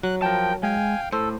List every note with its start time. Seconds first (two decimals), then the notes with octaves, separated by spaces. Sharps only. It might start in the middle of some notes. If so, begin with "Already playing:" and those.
0.03 F#3 F#6
0.22 F3 A#4 G5 A5
0.63 G#3 F5 G5 G#5
1.12 A2 A4 C5